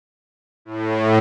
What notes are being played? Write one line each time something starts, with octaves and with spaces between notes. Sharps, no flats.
A2